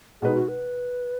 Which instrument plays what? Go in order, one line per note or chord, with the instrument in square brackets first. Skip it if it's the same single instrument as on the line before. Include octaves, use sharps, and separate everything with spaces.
[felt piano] B2 G#3 D#4 B4 [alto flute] G#4
[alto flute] F#4
B4